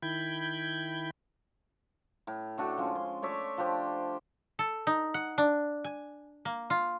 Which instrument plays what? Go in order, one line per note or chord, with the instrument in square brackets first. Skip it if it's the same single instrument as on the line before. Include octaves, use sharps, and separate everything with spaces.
[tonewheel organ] D#3 E4 G5 B5 G6 G#6
[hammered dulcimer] A2
A3 D4 F#4 A4
F3 G#3 C#4
C6
A3 C#5 D5 E5
F3 D4 G4 C5
[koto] A4
D#4
F#5
D4
G#5
A#3
F4